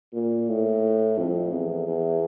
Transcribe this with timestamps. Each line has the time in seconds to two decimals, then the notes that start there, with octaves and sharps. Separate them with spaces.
0.14 A#2
0.49 A2
1.18 F2
1.52 E2
1.87 E2